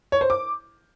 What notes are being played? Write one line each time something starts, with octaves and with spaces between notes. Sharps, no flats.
C#5
C5
D6